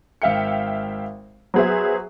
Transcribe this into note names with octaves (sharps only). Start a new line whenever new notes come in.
G#1 E5 F5 G5 C#7
F#3 B3 G#4 C5 E5